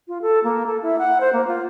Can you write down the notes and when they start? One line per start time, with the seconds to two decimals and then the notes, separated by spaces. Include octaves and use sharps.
0.08 F4
0.22 A4
0.44 A#3
0.66 A4
0.82 E4
0.99 F#5
1.20 C5
1.33 A#3
1.47 F4